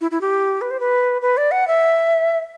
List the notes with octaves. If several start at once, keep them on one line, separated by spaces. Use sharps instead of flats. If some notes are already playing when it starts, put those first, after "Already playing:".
E4
E4
G4
B4
C5
B4
B4
D5
F#5
E5